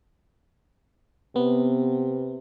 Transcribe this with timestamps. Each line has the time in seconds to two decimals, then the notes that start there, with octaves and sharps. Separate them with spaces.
1.36 C3 B3